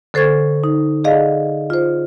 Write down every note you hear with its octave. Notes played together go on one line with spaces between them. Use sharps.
D3 A4 C5 C#6 G#6 A6
D#4
G#4 D5 D#5 F5 F#5
F4 C5